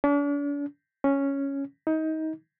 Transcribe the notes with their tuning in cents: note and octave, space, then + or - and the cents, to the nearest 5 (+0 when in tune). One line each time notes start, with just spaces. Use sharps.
D4 -40
C#4 +0
D#4 +25